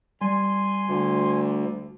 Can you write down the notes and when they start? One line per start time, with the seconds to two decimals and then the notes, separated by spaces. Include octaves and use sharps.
0.21 G3 G#5 C6
0.88 D2